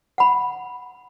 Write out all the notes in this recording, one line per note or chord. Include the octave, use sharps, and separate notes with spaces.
F#5 B5